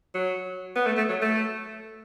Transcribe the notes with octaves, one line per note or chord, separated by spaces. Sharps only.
F#3
B3
A3
A3
F#3
A3